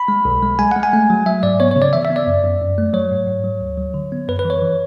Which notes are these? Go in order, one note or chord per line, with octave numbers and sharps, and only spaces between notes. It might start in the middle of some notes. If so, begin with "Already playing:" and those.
Already playing: B5
G#3
B1
G#3
G#3 G#5
G#3 F#5
G#5
A3
F#3
F#3 E5
G#2 D5
B3 C#5
C#3 C#5
D5
E3 E5
E5
B3
D5
F#2
F#2
F#2
A3
F#3 C#5
G#2
G#2
F#3
D2
F#3
D3
B3
F#2 B4
B4
E3
C#5
E3